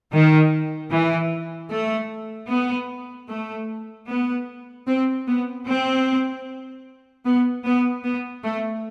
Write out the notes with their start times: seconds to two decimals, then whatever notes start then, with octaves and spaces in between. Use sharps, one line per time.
0.12 D#3
0.91 E3
1.70 A3
2.50 B3
3.29 A3
4.08 B3
4.87 C4
5.27 B3
5.66 C4
7.25 B3
7.65 B3
8.04 B3
8.43 A3